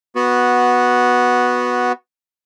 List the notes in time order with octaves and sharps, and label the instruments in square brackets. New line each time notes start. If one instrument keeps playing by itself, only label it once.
[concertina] B3 F#4